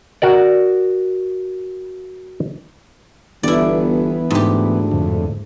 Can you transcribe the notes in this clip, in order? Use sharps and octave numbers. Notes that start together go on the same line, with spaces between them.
F#4 A#4 D5
G1 E3 B3 E4 D5
D2 G#2 G4
F2 A2 D3